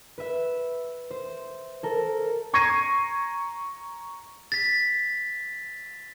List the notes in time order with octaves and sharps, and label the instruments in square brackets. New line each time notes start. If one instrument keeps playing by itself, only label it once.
[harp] B4 E5
C5
A4 A#4
[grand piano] A#5 C#6 G#6 A#6 C7 D#7
[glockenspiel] A6 B6